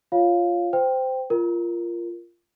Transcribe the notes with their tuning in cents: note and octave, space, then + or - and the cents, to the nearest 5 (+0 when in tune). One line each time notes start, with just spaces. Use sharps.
F4 -5 C#5 +0 F5 +0
C5 -20 G5 +0
F4 -15 A#4 +0